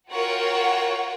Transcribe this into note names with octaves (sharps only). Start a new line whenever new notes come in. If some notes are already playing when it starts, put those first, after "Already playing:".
F4 F#4 A#4 C#5 F#5 G5